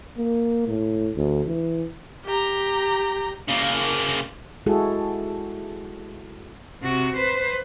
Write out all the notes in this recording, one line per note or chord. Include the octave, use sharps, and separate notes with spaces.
A#3
A2
D2
E3
G4 A#5
C#3 A#3
G#3 E4 F#4 G#4 A4
C3 F#4
B4 C5